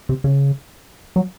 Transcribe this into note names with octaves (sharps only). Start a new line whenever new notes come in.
C3
C#3
F#3